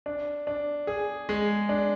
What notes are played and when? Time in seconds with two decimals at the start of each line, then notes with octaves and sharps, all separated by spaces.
0.06 D4
0.47 D4
0.87 G#4
1.29 G#3
1.69 D4